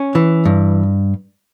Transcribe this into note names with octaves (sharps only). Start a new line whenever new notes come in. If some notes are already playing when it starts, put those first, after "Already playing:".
Already playing: C#4
E3
G2